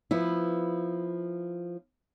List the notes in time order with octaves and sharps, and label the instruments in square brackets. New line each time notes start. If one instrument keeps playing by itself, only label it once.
[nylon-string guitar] F3 B3 E4